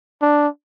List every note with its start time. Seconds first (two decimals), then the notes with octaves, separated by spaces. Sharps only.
0.22 D4